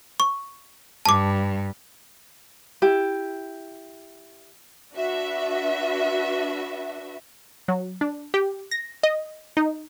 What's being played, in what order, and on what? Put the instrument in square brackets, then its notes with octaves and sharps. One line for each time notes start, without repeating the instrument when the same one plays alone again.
[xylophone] C#6
[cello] G2 [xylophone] A5 D6
[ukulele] E4 G4
[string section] D4 F#4 B4 E5
[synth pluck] F#3
D4
G4
A#6
D#5
D#4